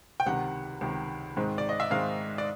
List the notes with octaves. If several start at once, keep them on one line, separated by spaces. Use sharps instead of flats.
G5
C#2 C3 D#3 F#5
C#2 C3 D#3
G#2 D#3 G#3 C4
D5
D#5
E5
G#2 D#3 G#3 C4 F5
D5